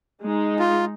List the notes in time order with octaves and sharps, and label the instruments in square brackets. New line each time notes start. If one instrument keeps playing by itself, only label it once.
[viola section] G#3 D#4
[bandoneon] F4